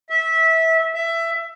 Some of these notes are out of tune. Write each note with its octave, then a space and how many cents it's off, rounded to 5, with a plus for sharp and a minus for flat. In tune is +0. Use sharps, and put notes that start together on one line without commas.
E5 -20
E5 +15